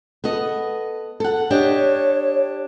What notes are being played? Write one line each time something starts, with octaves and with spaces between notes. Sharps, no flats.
B3 A4 D#5
A4 F#5
D4 G4 C#5 D#5